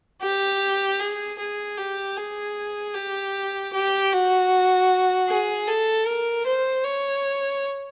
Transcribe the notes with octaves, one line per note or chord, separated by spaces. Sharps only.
G4
G#4
G#4
G4
G#4
G4
G4
F#4
G#4
A4
A#4
C5
C#5